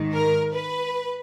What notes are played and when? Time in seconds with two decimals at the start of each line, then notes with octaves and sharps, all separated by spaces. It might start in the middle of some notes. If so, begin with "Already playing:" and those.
Already playing: G#2 D#3
0.15 A#4
0.54 B4